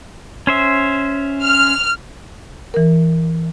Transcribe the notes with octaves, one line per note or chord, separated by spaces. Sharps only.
C#4 C5 E5
F6
E3 A#4